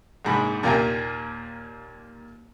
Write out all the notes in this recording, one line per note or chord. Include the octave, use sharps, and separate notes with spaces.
A#1 G#2 B5
D#2 A#2 A#3 G4 G#5 A#5